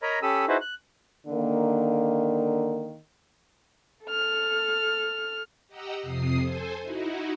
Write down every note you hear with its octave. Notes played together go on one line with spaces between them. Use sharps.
A#4 C#5 D#5 A#5 B5
C#4 G4 A4 B5 D#6 E6
D#4 E4 F#4 G#4 B4 C5
F#6
D3 D#3 A#3
A4 F6
G4 D#5 F#5 A#5 E6
F2 C3 D#6 C7
A4 C5 G#5
D#4 E4 F#4